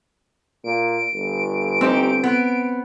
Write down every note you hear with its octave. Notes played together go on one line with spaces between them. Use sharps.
A#2 D7
G1
C4 D#4 G4
B3